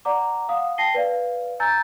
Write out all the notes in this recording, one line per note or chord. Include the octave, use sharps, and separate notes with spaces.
D5 F#5 A#5 D6
F5 F#5 D#6
G5 A5 A#6 C7 D#7 G7
B4 D5 F5
G#5 A#5 E6 G6 A6